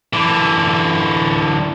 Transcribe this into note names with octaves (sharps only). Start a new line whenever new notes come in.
D3 E3